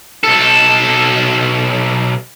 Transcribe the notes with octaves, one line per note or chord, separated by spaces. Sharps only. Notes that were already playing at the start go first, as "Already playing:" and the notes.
B1 A4